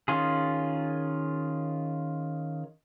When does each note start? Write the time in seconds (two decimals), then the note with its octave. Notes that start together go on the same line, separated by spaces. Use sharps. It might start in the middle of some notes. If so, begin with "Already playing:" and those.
0.08 D#3 C#4 F4 G#4